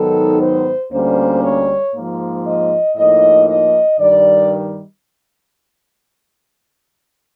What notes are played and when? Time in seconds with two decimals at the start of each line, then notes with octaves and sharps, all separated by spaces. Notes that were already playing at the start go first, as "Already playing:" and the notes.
Already playing: G#2 D#3 F#3 B3 D#4 A4
0.41 C5
0.92 D2 D3 G3 A#3 C#4 C5
1.44 C#5
1.95 G#2 F3 A#3
2.46 D#5
2.97 A2 F3 A#3 D#4 D#5
3.49 D#5
4.00 G2 D#3 G3 D5